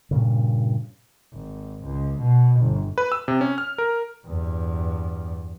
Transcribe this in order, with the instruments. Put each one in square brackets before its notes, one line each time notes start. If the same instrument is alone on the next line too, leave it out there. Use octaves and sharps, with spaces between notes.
[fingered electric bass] G2 A#2 C#3
[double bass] G#1
C#2
B2
G1
[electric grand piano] B4
E6
C3
C#4
F6
A#4
[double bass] E2 G2